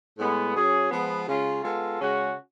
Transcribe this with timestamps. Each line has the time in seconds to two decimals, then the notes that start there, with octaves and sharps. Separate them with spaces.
0.18 A2 G#3 B3
0.55 F#3 C#4 G#4
0.91 F3 G#3 B3
1.27 C#3 G#3 C#4 F4
1.63 G#3 B3 F4 A4
2.00 C#3 G#3 C#4 F#4